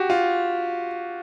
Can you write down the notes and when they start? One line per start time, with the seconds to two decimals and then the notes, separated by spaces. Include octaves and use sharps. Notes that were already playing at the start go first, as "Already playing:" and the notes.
Already playing: F#4 G4
0.10 F4